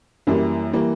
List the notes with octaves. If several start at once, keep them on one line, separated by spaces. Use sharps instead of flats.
F#2 E3 G3 A#3
E3 G3 A#3